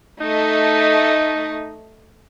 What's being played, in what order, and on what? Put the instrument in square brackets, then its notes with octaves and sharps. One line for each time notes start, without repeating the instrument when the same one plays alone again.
[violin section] A3 D#5 [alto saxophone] D#4